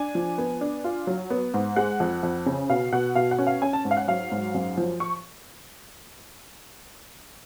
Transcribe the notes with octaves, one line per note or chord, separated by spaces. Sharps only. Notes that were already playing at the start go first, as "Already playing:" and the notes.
Already playing: D4 G#5
F3
B3
D4
F4
F#3
B3
G#2
G#3 F#5
F2
F2
C#3
B2 F5
B2 F#5
B2 F5
F#5
C#4
F5
C#4 G#5
A5
G#2
F5
F#5
F#3 F5
G#2
F#2
F3
C#6